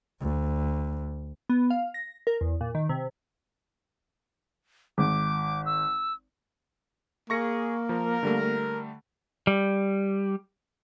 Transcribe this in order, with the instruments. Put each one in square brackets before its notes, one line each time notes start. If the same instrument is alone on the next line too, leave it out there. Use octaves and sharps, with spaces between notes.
[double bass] D2
[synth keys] B3
F5
A#6
A#4
E2
A#2
D#3
C3
[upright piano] G#1 [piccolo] D6
[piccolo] E6
[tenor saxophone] A#3 [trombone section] G#4 [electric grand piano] C#6 A#6 C#7
[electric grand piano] F3 [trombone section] A#4
[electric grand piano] D3 G3 A3
[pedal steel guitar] G3